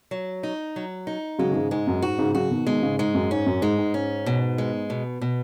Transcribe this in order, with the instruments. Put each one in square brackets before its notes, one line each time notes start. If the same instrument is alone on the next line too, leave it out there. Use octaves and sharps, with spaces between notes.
[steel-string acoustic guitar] F#3
D#4
F#3
D#4
[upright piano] C#3 F#3 [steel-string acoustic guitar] G#3
[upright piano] D#3
G#2 C#3
[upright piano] G#2 [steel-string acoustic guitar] G#3
[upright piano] F#2
[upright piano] G#2 [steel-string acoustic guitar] F#4
[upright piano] G#2 C#3
[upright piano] C#3 F#3 [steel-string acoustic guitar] F#4
[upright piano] B2 D#3
[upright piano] B2 D#3 [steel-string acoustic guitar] G#3
[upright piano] G#2 C#3
[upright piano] G#2 [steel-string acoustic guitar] G#3
[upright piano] F#2
[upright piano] G#2 [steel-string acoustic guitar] C#4
[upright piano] F#2
[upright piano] G#2 [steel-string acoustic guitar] G#3
[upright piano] G#2
[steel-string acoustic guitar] C#4
B2
G#3
B2
B2